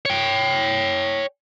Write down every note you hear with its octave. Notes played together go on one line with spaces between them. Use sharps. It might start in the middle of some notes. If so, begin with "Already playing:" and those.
C#5 G5